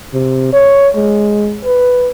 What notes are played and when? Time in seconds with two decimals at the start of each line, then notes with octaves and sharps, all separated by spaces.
0.14 C3
0.53 C#5
0.96 G#3
1.65 B4